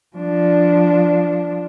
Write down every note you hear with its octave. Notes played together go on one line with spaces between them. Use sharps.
F3 D4